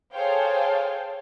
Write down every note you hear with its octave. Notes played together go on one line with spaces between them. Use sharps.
G#4 A4 C5 C#5 F5 G5